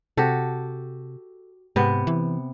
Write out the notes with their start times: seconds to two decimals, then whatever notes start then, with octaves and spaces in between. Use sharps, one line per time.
0.17 C3 F#4 G4 A4
1.76 G#2 C3 B3
2.07 E3